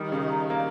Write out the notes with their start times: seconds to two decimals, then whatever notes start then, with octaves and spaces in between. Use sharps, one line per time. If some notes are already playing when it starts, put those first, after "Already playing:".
Already playing: D#3 G3
0.12 C#3
0.50 A#3